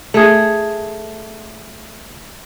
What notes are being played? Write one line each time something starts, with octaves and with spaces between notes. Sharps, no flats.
A3 G#4